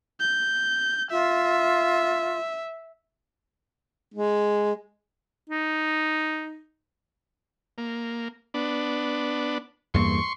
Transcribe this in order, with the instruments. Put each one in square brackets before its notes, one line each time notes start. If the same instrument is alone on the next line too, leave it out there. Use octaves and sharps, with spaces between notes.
[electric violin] G6
[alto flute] F4 [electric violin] E5
[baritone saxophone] G#3
[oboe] D#4
[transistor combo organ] A#3
B3 D4
[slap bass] E2 G2 A#3 [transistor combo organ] C6 C#6